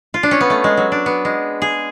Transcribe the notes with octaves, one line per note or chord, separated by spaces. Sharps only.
F4
D4
C#4
B3
A3
G#3
F#3
D4
B3
G#3
G#4